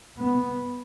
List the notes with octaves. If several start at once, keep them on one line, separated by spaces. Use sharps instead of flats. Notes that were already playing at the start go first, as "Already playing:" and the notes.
B3